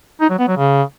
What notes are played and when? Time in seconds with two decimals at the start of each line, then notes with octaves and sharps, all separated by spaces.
0.21 D#4
0.30 F#3
0.39 B3
0.48 F#3
0.57 C#3